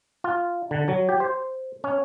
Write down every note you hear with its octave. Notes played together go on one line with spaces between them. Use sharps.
F4
D3
F#3
G4
C5
C#4